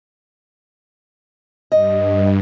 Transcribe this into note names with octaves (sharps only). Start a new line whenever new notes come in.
G2 D#5